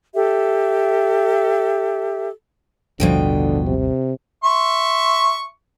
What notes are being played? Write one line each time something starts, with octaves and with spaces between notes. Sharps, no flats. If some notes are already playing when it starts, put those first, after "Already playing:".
G4 A4 E5
A1 D#2 B2 D3 F3 G3 G5
C3
E5 C6 C#6